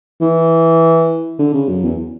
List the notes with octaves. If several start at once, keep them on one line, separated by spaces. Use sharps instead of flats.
E3
D3
C#3
F#2
E2